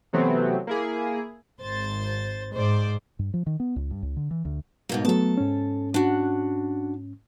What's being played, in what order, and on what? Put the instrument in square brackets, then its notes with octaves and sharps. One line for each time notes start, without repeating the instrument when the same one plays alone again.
[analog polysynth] C3 E3 F#3 A3 B3 C4
A#3 E4 G#4
[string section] G#1 C5 A6
[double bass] G#2 [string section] C5 D5
[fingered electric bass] G2
F3
D#3
B3
C#2
G2
C#2
D3
E3
D2
[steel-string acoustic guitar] G#2 B2 A#3
[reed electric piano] F#3 A3 B3 [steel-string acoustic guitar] A4 A5
[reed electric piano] G#2 C#4
[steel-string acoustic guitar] D4 F#4